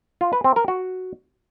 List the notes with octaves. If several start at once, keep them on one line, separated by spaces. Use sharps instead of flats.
F4
B4
C4
A#4
F#4